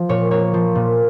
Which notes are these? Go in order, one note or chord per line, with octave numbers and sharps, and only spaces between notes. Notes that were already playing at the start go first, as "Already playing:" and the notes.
Already playing: F3
A#2 C#5
A#3 C#5
F3
A#2